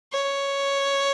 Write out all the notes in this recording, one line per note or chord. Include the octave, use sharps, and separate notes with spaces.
C#5